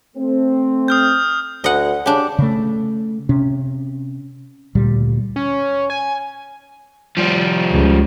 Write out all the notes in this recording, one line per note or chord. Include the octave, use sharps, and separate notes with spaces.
A3 C4
D#6 F6 G6
D2 D#5 F#5
C#3 D4 G4
C#3 A3
C3 C#4
D2 A#2 G3
C#4
G#5
F3 G3
C#2